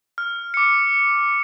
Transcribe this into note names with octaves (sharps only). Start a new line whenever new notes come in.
F6
D6 C#7